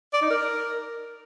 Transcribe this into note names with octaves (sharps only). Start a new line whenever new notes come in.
D5
D#4
A#4